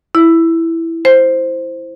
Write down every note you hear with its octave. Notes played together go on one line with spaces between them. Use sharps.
E4
C5